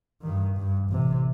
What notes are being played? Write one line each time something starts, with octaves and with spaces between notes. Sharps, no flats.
G2 D#3
G2
A1 C3